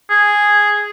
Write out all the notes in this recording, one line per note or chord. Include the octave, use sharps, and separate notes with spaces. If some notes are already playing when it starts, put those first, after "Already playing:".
G#4